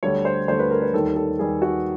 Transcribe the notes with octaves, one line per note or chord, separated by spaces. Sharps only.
D2 D3 G3 C#5
C5
D2 D3 G3 C5
B4
A#4
B4
D#2 D#3 G3 A4
A4
D#2 D#3 G3 G#4
F#4